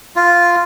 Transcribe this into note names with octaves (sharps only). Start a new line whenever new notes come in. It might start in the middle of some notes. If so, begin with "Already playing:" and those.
F4